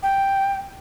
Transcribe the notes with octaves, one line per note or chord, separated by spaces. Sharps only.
G5